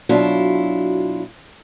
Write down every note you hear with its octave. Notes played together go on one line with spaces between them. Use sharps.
B2 F#3 D4 E4 F4